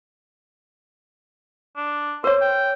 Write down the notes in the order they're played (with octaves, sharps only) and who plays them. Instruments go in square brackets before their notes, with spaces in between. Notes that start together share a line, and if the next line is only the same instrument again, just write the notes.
[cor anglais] D4
[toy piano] A#4 C#5 [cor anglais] C5
[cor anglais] G5